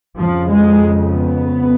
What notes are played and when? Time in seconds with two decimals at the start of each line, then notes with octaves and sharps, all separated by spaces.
0.18 F2 C#3 F3
0.50 G#3
1.12 B3